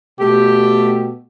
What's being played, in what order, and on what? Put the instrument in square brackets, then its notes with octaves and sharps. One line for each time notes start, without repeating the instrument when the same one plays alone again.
[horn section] B2 A3 G4